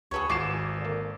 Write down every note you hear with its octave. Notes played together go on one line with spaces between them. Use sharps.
D2 G#4 A4 B4 C#5
G#1 F4 F#4 B4 D6 C7 E7
D3 A#3